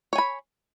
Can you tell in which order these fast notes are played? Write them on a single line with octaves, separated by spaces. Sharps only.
C#5 G#5 B5